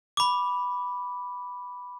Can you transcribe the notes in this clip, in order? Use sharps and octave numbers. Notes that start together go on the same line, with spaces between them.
B5 D6